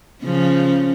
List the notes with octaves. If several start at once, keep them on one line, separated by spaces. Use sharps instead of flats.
C#3 F3 C#4